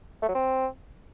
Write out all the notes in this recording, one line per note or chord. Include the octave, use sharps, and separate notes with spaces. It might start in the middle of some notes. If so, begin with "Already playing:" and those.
A3
F#3
C4